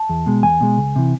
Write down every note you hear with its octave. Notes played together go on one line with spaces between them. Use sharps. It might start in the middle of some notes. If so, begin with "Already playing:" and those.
Already playing: A5
E2
B2 G#3
E2 G#5
B2 G#3
C#2
C3 E3